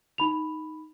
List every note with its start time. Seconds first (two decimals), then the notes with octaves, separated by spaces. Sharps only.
0.18 D#4 B5 F7